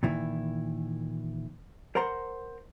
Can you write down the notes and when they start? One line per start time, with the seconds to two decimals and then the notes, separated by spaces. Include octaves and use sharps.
0.03 A#2 D#3 E3 E4
1.95 A#4 C5 F#5 A#5 C6